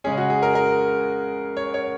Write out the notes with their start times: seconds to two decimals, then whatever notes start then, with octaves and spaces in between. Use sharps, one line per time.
0.04 C#3 G#3 C#4 G#4
0.17 F#4
0.30 G#4
0.43 A#4
0.55 A#4
1.57 C#5
1.74 C#5